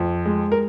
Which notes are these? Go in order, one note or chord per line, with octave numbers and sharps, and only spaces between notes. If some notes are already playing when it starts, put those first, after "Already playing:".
Already playing: F2
G#3
A#4